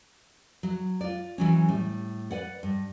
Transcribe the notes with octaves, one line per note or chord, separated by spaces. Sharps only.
F#3
F4 D5
E3 F#3 C#4
A2 G3
B4 D5 F#5
G2